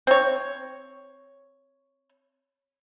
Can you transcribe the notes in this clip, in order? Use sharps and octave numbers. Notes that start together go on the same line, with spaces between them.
C4 C#5